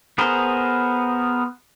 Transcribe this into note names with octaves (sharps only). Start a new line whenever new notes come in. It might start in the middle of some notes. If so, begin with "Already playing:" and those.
B3 G#4 A#4 C5